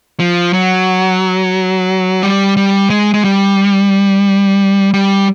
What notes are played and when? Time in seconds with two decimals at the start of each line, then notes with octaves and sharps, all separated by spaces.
0.20 F3
0.53 F#3
2.23 G3
2.57 G3
2.90 G#3
3.14 G#3
3.24 G3
4.94 G3